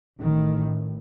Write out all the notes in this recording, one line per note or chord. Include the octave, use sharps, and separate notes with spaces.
A1 A2 D#3